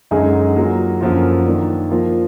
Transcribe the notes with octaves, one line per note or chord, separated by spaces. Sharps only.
F#2 D3 G#3 D#4 G#4
F#3 A#3 F4 A#4
F#2 D3 F3 A#3 F4
D#3 A#3 D4
F3 A#3 F4 A#4